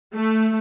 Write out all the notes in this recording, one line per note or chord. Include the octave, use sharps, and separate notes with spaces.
A3